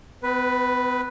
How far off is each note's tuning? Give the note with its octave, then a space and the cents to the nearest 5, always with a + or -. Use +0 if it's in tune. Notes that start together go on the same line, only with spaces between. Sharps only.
B3 +40 B4 +0